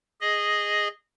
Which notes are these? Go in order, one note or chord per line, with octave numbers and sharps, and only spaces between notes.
G#4 D#5